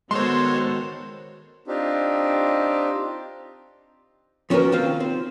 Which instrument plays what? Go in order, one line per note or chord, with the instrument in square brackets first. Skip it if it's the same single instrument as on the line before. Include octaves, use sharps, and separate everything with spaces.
[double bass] D#3 B3 [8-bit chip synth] G#3 C#5 [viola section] F#4 A4 C5 [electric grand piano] C6
[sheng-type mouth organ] C4 D4 D#4 F4 G4
[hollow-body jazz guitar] F3 C#4 F#4 G#4 A#4 B4
D#3 C4 F4 F5
C4